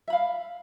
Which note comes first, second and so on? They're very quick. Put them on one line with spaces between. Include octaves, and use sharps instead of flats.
E5 B5 F5